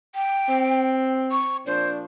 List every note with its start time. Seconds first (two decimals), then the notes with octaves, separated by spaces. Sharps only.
0.15 G5
0.49 C4
1.31 C#6
1.66 A#2 F3 D4 C5